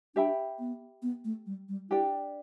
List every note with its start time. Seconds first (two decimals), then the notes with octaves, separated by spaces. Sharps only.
0.15 D4 G4 E5 G5 B5
0.59 B3
1.02 B3
1.25 A3
1.46 G3
1.69 G3
1.90 D4 E4 G4 D5 G5